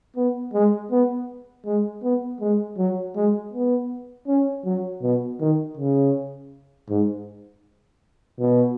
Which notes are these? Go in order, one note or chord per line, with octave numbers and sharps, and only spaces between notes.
B3
G#3
B3
G#3
B3
G#3
F#3
G#3
B3
C#4
F#3
B2
D#3
C#3
G#2
B2